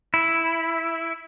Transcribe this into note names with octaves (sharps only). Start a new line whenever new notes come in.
E4